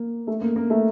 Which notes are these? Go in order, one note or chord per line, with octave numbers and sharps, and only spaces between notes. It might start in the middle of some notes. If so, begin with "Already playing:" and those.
Already playing: A#3
A3
A#3
A#3
A3